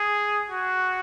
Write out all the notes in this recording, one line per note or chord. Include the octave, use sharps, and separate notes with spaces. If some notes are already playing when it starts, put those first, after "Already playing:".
Already playing: G#4
F#4